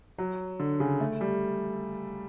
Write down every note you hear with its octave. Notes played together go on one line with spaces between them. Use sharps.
F#3
D3
C#3
A3
G3